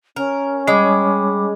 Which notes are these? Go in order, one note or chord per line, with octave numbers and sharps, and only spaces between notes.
C#4 A#4
G3 G#3 B5 D6